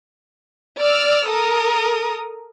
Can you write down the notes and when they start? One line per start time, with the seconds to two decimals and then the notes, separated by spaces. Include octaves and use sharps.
0.81 D5 E6 F6
1.29 A4 A#4 D#6